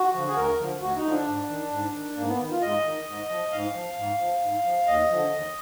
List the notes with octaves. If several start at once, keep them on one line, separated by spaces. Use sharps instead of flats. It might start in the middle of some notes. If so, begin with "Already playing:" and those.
Already playing: F#4
D3 F3
G#4
D2 A#4
D3 F3
D2 F#4
D#4
D3 F3
D4
G#2
D#3
G#2
D#3
G#2 A#3
B3
D#3
F4
G#2 D#5
D#3
G#2
F3
G#2 F5
F3
G#2
F3
G#2
F3
D#2 D#5
D3 F3
D#2